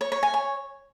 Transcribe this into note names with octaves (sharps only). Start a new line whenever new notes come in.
C#5
C#5
G#5
C#5